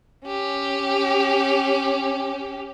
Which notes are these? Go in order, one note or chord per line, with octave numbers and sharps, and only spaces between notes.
C#4 G4